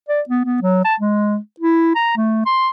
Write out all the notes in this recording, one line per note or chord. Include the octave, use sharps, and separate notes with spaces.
D5
B3
B3
F#3
A5
G#3
E4
A#5
A3
C6